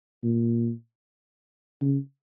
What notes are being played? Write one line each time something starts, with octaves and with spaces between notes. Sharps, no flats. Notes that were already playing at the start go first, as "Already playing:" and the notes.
A#2
C#3